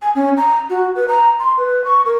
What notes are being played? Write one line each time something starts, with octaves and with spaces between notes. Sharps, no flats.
G#5
C#4
A#5
F#4
B4
A#5
C6
B4
C#6
A#4